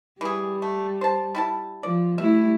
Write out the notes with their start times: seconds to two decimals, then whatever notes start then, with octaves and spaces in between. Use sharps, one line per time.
0.21 E3 G3 G#4
0.62 A3
1.01 C5 A5
1.35 G3 E4 A5
1.83 F3 D5
2.18 G3 A3 E4 E5